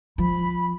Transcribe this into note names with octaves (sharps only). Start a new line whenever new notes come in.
F3 B5